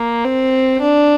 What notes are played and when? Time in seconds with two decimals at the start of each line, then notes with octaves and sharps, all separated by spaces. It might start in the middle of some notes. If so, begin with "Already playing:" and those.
Already playing: A#3
0.24 C4
0.81 D4